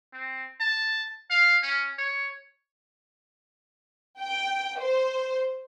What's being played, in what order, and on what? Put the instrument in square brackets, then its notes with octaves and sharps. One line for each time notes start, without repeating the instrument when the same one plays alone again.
[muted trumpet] C4
A5
F5
C#4
C#5
[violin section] G5
C5